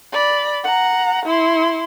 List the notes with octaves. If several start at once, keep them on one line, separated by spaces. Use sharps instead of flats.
D5 B5
F#5 A#5
E4 C6